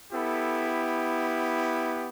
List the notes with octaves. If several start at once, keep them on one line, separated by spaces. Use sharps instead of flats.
B3 E4 G4 A4